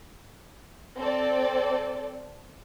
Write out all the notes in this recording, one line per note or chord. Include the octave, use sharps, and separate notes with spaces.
C4 A4 D5